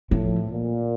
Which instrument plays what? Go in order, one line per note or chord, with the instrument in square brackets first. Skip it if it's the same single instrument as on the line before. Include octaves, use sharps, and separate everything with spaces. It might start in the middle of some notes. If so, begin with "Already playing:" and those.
[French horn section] A2 [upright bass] F3
[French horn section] A#2